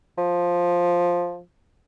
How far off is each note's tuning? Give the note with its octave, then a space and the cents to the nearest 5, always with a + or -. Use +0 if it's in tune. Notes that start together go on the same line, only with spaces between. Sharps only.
F3 +5